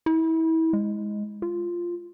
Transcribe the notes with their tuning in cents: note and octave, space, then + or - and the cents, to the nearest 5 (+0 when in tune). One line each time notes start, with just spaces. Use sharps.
E4 -30
G#3 +0
F4 -5